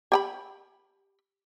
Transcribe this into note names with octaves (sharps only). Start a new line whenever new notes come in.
G4 G5 B5